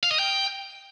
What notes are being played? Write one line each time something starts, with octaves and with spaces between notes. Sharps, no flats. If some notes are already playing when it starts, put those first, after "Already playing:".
F5
D#5
G5